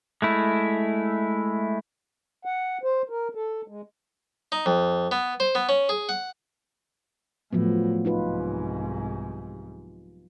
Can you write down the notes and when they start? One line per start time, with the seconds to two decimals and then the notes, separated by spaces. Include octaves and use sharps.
0.22 G#3 A3 E4
2.45 F#5
2.83 C5
3.09 A#4
3.35 A4
3.68 G#3
4.52 D#4
4.66 F2
5.11 B3
5.40 C5
5.55 B3
5.69 C#4
5.89 G#4
6.09 F#5
7.53 A2 F3 F#3 B3
8.05 C2 G#2 D#4 F4 B4